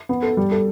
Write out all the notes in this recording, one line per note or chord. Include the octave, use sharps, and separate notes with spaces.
B3
A4
G3
A4